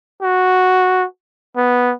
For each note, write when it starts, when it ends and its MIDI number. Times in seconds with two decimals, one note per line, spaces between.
0.22 1.06 66
1.57 1.93 59